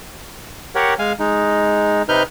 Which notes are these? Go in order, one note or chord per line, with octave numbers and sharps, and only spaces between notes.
G4 A#4 C#5 F#5
G#3 F5 G#5
G#3 D#4
C3 D#4 B4 F6 G6